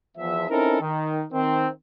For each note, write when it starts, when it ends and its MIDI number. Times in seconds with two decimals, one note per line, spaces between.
0.17 0.48 40
0.17 0.48 53
0.17 0.48 76
0.49 0.79 60
0.49 0.79 61
0.49 0.79 63
0.49 0.79 64
0.49 0.79 69
0.49 0.79 70
0.80 1.24 51
1.32 1.68 51
1.32 1.68 60